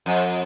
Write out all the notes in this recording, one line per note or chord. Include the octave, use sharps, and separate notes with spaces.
F2